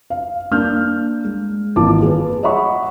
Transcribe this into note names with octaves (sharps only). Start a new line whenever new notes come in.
F5
A#3 D4 F6 G6
G#3
G#1 E3 A#3 F4 A5 D6
G#4 B4
C#5 D#5 E5 F#5 B5 C#6